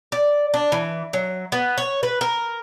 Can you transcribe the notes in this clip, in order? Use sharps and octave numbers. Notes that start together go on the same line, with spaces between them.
D5
D4
E3
F#3
B3
C#5
B4
A#4